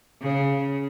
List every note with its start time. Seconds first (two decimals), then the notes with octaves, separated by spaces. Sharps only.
0.22 C#3